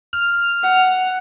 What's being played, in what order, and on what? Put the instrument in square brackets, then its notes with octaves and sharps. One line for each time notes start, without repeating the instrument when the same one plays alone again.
[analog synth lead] F6
[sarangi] F#5